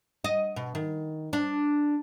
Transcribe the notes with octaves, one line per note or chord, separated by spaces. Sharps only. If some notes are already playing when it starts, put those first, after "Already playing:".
D#5
B2
D#3
D4